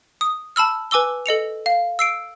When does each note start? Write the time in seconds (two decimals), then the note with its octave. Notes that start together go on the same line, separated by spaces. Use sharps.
0.21 D#6
0.56 A5 B5 E6 F6
0.91 B4 G#5 D6 E6 G7
1.26 A4 D#5 C#7 F7
1.66 F5
1.99 E6 C7 D7